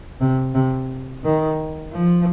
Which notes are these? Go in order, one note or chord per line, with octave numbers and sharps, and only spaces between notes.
C3
C3
D#3
F3